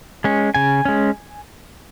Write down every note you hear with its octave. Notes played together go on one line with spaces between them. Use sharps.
G#3 C#4
C#3 G#5
G#3 C#4